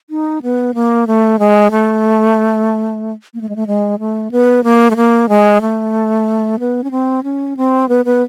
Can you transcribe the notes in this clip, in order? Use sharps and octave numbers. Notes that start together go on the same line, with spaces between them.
D#4
B3
A#3
A3
G#3
A3
A#3
A3
G#3
A3
G#3
A3
B3
A#3
A3
A#3
G#3
A3
B3
C#4
C4
C#4
C4
B3
B3